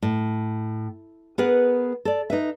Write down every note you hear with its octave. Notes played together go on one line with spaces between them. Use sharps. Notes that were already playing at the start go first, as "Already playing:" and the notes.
A2
B3 G#4 A#4 B4 F#5
A4 D5
D#4 B4 E5